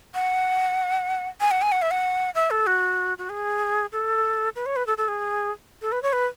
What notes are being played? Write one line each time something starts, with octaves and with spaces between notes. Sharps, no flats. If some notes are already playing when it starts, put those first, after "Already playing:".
F#5
G#5
F#5
G#5
F#5
E5
F#5
E5
A4
F#4
F#4
G#4
A4
B4
C#5
B4
A4
A4
G#4
A4
B4
C#5
B4